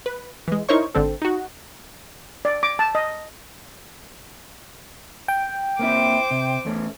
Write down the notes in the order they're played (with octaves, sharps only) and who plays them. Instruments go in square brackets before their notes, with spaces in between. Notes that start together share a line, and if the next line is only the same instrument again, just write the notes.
[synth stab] B4
E3 G#3
D#4 E4 A#4 C5 C#5 C#6
G#1 D3 C4 A4
D#4 F#4
[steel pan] D5
D6
A5
D#5
[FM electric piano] G5
[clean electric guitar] A#3 C4 E4 [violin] C5 D6
[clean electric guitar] C3
E2 A3 C#4